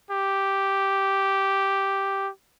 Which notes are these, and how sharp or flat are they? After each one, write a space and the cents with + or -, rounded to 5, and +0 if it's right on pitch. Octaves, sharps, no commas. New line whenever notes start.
G4 -5